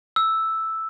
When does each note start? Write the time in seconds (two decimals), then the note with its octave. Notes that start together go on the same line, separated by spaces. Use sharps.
0.16 E6